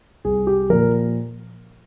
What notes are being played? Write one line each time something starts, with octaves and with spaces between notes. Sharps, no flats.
C2 G#4
G4
A#2 F3 A#4